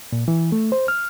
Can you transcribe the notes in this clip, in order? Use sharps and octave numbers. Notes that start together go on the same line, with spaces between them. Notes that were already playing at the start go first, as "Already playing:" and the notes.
A#2
E3
A3
C5
F6